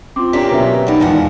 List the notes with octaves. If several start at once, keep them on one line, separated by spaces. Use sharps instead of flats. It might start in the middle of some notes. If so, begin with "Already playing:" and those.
C4 F4 C6 D6
A#3 C#4 D4 G4 A#4 G5 A#5 B6
B2 F#3 B4 E5
D#4 D5 F#5 B5
E2 G#2 D#3 F3 F#5 G#5